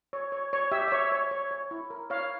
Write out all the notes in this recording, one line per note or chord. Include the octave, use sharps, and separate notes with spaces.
C#5
C#5
C#5
G4 E5
E5
C#5
C#5
C#5
C#5
E4
A#4
E4 C#5 F5